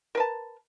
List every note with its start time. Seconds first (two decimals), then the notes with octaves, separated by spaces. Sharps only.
0.15 A#4
0.17 B4
0.20 A5